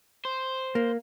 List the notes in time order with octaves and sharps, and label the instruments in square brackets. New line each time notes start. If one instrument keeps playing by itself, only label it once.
[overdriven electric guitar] C5
[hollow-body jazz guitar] A#3